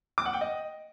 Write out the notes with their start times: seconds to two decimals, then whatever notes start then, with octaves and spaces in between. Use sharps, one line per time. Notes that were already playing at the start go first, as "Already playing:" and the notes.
0.18 D6
0.26 F#5
0.33 G5
0.41 D#5